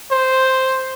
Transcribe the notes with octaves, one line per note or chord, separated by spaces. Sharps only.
C5